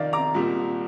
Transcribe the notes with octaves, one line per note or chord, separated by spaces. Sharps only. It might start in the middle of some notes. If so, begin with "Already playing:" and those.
Already playing: F2 C3 D#3 D5 F5
A#5 D6
C2 A#2 G3